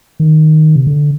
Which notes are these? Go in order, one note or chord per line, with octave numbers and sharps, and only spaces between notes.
D#3
C3
D3